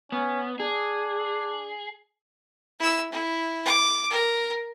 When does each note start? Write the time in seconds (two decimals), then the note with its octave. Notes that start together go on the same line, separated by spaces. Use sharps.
0.12 B3 C#4
0.60 D4 G#4
2.79 E4 E6
3.11 E4
3.66 D6
4.10 A#4